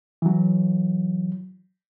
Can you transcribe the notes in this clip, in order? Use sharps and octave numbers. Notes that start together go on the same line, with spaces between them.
E3 F#3